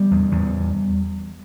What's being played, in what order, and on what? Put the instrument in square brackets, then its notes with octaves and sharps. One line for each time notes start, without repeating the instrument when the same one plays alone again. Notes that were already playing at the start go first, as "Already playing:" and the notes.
Already playing: [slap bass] G3 B3
E2
E2